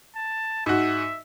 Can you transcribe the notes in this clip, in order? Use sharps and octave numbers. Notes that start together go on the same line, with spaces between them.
A5
G#2 F#4 E5